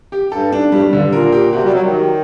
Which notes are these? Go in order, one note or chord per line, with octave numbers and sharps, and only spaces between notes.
G4
G2 A4
D4
G2 G3
A2
G2
G2 D3
A#2 A#4
G4
C3 F#4
G3
F#3 F#4
D#3
G4